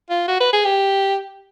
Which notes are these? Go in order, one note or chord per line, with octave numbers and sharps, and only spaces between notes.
F4
F#4
B4
G#4
G4